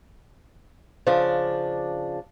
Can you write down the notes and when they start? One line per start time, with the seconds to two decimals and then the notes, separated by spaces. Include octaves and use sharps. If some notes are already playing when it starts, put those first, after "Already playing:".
1.07 C#3 F3 D4